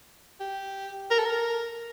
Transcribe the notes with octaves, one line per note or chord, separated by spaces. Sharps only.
G4
A#4
A4
A#4